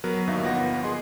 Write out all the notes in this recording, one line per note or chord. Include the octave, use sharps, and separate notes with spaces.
F#3 B3 A#4 B4
G1 D#2 D#4 B4 E5 F5
G1 F3 B3 B4 F#5 A#6
G#4 D#5 C6